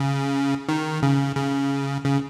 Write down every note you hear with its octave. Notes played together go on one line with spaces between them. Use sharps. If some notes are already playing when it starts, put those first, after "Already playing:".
Already playing: C#3
D#3
C#3
C#3
C#3